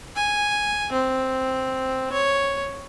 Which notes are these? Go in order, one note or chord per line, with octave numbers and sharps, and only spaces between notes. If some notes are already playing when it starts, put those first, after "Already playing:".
G#5
C4
C#5